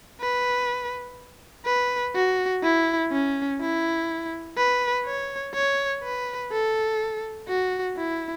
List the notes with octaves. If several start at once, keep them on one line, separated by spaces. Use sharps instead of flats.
B4
B4
F#4
E4
C#4
E4
B4
C#5
C#5
B4
A4
F#4
E4